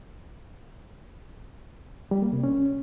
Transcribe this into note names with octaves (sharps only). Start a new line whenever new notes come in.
G3
A#3
C3
C#4